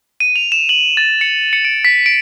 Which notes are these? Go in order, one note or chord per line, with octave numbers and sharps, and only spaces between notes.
D#7
F7
E7
F#7
A6
C#7
C#7
D7
B6
D7